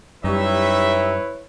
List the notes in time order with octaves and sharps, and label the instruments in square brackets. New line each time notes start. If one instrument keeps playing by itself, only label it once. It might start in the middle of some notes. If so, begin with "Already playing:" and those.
[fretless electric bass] F#2 G3 [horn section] D#4 G4 E5 [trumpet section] E4 B4 C#5